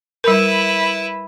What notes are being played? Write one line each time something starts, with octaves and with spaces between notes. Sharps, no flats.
G3 E4 A#4 B4